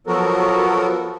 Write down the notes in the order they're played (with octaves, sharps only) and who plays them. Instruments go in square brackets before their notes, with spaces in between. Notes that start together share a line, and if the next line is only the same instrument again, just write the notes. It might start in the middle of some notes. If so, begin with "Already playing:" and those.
[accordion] F3 F#3 B3 F#4 A4 A#4